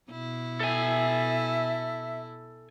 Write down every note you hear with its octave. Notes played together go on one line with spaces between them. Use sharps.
B2 E4
A4 E5 G#5